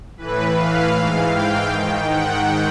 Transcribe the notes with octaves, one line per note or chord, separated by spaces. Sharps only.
A2 E3 B4
F5
G#2 E3
G5
G#2 D#3
F#5